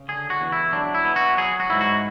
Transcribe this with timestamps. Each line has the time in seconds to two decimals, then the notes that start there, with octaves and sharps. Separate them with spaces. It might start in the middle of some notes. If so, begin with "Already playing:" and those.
Already playing: C#3
0.08 D3 G#4
0.30 F#4
0.41 E2
0.52 E4
0.73 F#3 D4
0.94 E4
1.05 B3
1.16 F#4
1.37 F#3 G#4
1.60 F#4
1.70 G#2 E4
1.81 F#4